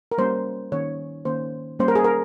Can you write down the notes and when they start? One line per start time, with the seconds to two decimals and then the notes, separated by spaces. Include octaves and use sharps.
0.12 A#4
0.18 G3 A#3 C#4 C5
0.72 D#3 A#3 C#4 C#5
1.25 D#3 A#3 C#4 C5
1.79 G3 A#3 C#4 C5
1.88 A#4
1.96 G#4
2.04 A#4